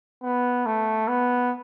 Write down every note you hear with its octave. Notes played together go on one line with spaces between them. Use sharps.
B3
A3
B3